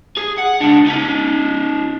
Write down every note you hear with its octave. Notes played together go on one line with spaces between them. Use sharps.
G#4
F#5
C#2 D4
C#4 D#4